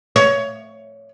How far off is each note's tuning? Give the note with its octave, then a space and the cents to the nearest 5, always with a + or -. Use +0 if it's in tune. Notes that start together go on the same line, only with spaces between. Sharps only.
C#5 +15